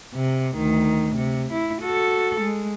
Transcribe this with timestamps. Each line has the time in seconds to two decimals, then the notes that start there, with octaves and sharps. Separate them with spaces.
0.15 C3
0.55 D2 D#3
1.16 C3
1.53 E4
1.82 F#4 A4
2.41 G#3